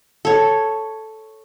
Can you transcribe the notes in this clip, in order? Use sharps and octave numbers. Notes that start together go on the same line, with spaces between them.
A4 C#5